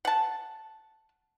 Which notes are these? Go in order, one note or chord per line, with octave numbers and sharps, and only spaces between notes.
F#5 A5